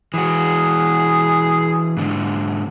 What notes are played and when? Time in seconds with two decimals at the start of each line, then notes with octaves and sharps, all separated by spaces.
0.14 E3 F#4 G#4
1.97 G#2 D3